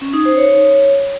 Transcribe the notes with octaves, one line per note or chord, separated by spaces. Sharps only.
C#4
D#4
C5
C#5